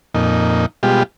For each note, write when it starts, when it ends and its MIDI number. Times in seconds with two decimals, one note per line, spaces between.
0.14 0.66 41
0.14 0.66 46
0.14 0.66 63
0.83 1.03 47
0.83 1.03 55
0.83 1.03 56
0.83 1.03 65
0.83 1.03 67